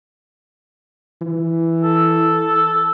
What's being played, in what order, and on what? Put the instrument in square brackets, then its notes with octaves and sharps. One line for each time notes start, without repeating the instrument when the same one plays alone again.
[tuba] E3
[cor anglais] A4